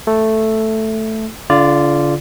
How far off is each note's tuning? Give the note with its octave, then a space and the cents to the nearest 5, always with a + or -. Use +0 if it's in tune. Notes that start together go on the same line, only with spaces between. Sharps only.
A3 +0 A4 +0
D3 -40 F4 -15 D5 +0